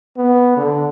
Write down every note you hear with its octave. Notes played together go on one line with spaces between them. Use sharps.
B3
D3